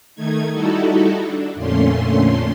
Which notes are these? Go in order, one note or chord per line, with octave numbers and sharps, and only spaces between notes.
D#3 A3 D#4 G#6
G3 D#4 E4 F#4 A4
D4
F2 A#2 D3 A3 C#4 C6